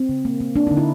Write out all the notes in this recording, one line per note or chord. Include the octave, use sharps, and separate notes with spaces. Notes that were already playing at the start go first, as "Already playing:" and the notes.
Already playing: C4
C#3
A#3
A#3
A#3 D4
D3 D#4
E4